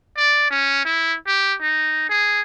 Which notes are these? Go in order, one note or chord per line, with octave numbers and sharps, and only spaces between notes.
D5
C#4
E4
G4
D#4
G#4